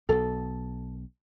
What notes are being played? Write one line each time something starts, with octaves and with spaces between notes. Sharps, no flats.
B1 B2 A4